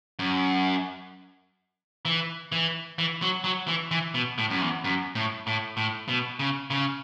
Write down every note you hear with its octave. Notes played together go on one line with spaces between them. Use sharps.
F#2
E3
E3
E3
F#3
F#3
E3
E3
B2
A2
F#2
E2
F#2
A2
A2
A2
B2
C#3
C#3